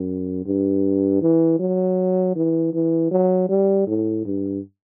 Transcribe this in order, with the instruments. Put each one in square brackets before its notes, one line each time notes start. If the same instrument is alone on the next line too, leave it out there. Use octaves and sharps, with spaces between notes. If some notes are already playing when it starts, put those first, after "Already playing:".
Already playing: [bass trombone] F#2
G2
E3
F#3
E3
E3
F#3
G3
A2
G2